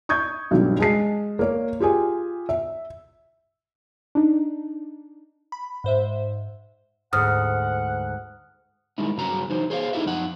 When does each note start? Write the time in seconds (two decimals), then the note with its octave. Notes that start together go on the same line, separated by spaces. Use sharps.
0.09 C#6 D#6 G6 G#6
0.51 B1 G2 C#3 F#3 G3
0.79 G#3 G#4 A5 C7
1.39 A#3 C#5
1.80 F4 G4 G#4 G#5
2.49 E5
4.15 D4 D#4
5.52 B5
5.84 G#2 C5 E5
7.13 D2 G#2 F#5 D#6 F6
8.98 D#3 G3 G#3 D#4 E4
9.17 G2 C#3 F#3 C#4 F#4 A#5
9.49 E3 F#3 D#4 C5
9.70 G#4 C5 C#5 D#5 F5
9.93 D#4 E4 G4 A4 D#5 E5
10.05 F#2 F3 D#4 F#5